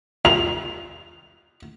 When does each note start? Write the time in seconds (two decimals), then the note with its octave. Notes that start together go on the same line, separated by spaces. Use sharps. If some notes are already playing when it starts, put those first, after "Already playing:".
0.25 C2 F4 F5 F7